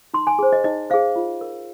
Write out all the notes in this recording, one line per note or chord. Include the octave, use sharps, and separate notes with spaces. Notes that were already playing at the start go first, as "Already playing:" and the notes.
D#4 C6
G#5
G#4 C5
D#5
D#4 D#5
G#4 C5 F5
F4
A#4